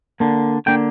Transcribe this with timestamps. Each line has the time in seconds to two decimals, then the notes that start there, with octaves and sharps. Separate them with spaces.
0.20 D3 A#3 D4
0.66 D3 A#3 D4 G5